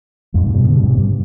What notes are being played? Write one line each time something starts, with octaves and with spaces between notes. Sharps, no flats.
F2 G#2
G#2 C3
G2 B2
B2 D3
G#2 C3
G2